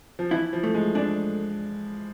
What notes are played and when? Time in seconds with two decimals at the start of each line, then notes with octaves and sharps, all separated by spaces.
0.19 F3
0.31 E3 E4
0.53 F3
0.63 A3
0.74 G#3
0.95 G#3 D4